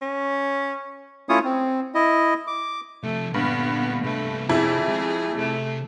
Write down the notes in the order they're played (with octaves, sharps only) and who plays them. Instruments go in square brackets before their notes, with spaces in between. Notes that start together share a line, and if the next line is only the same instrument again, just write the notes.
[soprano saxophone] C#4
[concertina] A3 C#4 E4 F4 C#5 D#6
C4
E4 D#5
D6
[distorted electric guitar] C3 F3 [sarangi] A3
[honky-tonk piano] G2 [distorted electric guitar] A#2 D3 [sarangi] B3
[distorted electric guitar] C2 B4 [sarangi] A3
[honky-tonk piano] F2 E4 [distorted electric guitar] C3 D4 [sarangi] G#4
[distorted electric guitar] G#3
[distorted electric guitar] C3 [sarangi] A3